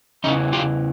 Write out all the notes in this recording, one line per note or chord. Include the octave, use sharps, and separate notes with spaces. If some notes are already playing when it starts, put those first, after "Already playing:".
E2 C#3 E3 C#4 D#4
F4 G4